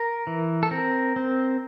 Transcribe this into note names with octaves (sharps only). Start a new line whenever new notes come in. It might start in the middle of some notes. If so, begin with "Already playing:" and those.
Already playing: A#4
E3
A4
C4 A#4
C4